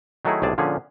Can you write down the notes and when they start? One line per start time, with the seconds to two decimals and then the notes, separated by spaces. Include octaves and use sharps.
0.25 D#3 F#3 A3 D#4 E4 G#4
0.42 B1 A2 C3 G#4 D5 A5
0.58 A#2 D3 F3 C#4 G#4